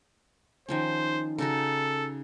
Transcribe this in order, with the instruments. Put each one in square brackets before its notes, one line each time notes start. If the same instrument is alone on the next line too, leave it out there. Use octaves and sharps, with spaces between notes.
[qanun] D#3 F3 C#4 [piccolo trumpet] C5
[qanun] C#3 D#4 F#4 [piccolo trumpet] A4